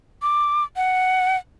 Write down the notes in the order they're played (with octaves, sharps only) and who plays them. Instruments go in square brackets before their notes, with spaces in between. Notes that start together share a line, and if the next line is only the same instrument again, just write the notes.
[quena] D6
F#5